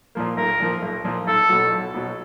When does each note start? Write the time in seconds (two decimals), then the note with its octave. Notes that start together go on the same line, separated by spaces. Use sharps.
0.15 A#2 F3 A#3
0.37 B1 A#4
0.60 A#2 F3 A#3
0.82 B1
1.05 A#2 F3 A#3
1.27 B1 A4
1.49 B2 F#3
1.72 B1
1.94 B2 F#3